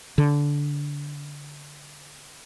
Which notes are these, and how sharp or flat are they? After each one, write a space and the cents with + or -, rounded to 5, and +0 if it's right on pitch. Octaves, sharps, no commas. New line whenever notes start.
D3 -15